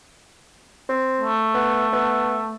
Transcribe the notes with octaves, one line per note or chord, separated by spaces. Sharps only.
C4
A3
B3
B3